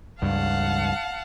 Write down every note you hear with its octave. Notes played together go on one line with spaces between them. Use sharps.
C#2 G2 F5 F#5 A5